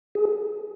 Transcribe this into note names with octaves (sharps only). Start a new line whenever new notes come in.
G#4